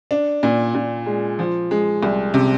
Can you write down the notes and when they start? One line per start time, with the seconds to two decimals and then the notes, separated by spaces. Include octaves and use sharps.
0.11 D4
0.43 A#2
0.74 A#2
1.06 G#3
1.39 F3
1.71 G#3
2.03 C2
2.34 C3